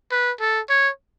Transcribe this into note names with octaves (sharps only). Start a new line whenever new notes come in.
B4
A4
C#5